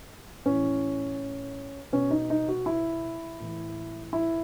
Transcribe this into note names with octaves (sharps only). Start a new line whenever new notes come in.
A2 E3 C#4
B2 C#4
D#4
D#4
F#4
E4
A2 E3
E4